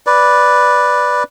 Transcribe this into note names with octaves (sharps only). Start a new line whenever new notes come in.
B4 D5